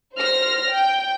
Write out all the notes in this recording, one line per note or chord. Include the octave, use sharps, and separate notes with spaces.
C5 F6 A#6
G5